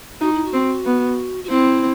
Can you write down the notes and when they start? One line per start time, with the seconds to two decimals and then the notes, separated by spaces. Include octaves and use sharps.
0.21 D#4 F#4
0.33 E4
0.45 F#4
0.53 C4
0.85 B3
1.44 F#4
1.50 C4 E4